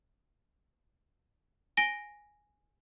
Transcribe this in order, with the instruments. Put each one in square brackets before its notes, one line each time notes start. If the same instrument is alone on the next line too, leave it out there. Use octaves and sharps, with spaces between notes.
[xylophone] G#5 A#6 D7 G7